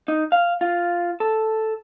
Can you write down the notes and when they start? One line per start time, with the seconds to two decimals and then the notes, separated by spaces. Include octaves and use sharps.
0.08 D#4
0.32 F5
0.61 F4
1.20 A4